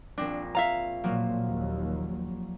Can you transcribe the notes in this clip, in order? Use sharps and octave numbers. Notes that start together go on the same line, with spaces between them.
A#1 C4 D4 A#6
E5 F5 A#5
A#2 F3 F#3 A#3
D#2